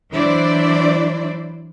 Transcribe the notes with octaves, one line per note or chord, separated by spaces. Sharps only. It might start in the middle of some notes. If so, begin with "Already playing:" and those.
E3 F#3 D4 E4 C5 D5